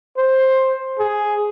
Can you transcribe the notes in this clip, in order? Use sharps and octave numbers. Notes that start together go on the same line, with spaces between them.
C5
G#4